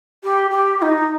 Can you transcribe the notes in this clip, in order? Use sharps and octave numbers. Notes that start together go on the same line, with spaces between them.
G4
G4
G4
D#4